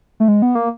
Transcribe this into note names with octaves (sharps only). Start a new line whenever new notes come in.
A3
G#3
B3
A#3